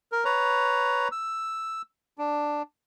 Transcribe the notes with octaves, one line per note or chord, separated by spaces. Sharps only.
A#4
B4 C#5 A#5
E6
D4